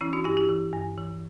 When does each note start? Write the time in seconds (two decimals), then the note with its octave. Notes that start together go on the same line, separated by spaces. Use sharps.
0.01 E3 C#4 E4
0.13 D4 F#4
0.24 G2 E4 G4
0.37 E4 G4
0.49 E3
0.73 G2
0.97 E3